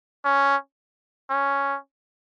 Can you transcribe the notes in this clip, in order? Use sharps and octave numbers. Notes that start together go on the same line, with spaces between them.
C#4
C#4